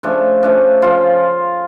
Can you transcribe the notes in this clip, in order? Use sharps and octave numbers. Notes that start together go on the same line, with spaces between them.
C#3 F3 A3 D4
C#3 F3 A3 D4
C#3 F3 F4